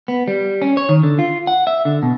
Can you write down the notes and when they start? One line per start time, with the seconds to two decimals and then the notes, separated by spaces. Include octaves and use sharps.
0.08 B3
0.28 G3
0.62 C#4
0.77 C#5
0.89 D#3
1.04 D3
1.19 F4
1.47 F#5
1.67 E5
1.85 D3
2.03 B2